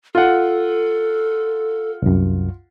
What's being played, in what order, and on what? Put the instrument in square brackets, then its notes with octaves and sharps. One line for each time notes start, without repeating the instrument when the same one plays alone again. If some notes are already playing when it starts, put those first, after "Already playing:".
[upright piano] F4 F#5 [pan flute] A4
[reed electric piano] C2 F#2